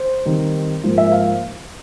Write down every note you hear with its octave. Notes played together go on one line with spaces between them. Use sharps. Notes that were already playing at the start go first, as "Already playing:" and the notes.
Already playing: C5
D#3 G3 C4 D#4
G#2 F3 A#3
E5
F5